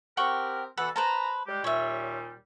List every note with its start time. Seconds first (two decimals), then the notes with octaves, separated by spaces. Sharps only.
0.17 C4 G4 A#4 F#5 G5 C#6
0.77 B2 E3 A4 B4 F#5
0.96 B4 C5 A5 A#5
1.47 G3 G#3 G4
1.64 D#2 A#2 G3 C#5 E5